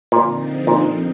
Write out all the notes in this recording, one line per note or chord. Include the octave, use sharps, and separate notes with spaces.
A#2 D3 F3 C4 D#4
A#2